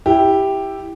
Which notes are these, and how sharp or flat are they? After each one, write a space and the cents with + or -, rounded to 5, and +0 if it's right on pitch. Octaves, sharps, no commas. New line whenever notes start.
E4 +0 G4 +0